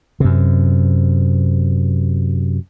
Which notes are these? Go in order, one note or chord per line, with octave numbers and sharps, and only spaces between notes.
F#2 C3